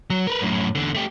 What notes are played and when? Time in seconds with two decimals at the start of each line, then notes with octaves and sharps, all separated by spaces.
0.10 F#3
0.27 A#4 B4
0.41 F#2 A2
0.75 E2 D3
0.95 A3 G4